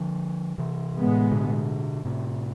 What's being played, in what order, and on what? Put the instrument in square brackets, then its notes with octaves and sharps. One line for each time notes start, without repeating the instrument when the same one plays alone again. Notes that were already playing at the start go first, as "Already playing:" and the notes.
Already playing: [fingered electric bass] D3 F3
C3 E3
[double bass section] A2 G#3 B3
[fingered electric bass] B2 D3
A2 C3